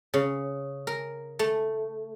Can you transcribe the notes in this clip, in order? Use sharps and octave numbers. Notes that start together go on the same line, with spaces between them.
C#3
A#4
A3